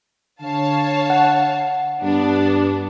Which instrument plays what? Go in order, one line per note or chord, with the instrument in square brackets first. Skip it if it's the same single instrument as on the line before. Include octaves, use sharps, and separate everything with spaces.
[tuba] D3 [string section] C#5 F5 A5
[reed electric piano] F#5
[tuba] G2 [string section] B3 D4